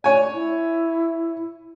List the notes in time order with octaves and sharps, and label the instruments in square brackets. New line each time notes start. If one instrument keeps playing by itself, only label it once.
[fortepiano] C#5 G#5 [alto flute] D5
[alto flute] E4